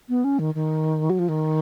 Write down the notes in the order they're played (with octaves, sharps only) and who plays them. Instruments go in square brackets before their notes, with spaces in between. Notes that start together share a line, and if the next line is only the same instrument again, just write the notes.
[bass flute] B3
C#4
D#3
D#3
F#3
F3
D#3